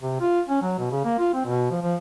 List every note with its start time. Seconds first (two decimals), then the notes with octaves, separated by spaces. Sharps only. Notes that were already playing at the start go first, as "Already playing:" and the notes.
0.02 C3
0.20 F4
0.49 C#4
0.62 F#3
0.79 B2
0.91 C#3
1.05 A#3
1.19 F4
1.34 C4
1.46 B2
1.70 F3
1.82 F3